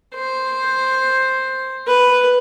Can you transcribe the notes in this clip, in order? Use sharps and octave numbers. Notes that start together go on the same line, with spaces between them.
C5
B4